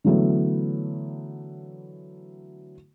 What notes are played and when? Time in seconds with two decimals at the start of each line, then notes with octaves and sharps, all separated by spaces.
0.04 D3 E3 F#3 A3 B3